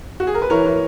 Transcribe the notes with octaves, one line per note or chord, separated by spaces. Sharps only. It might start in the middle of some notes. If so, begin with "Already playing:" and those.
F#4
G#4
A#4
B4
E3 A#4 C#5
E3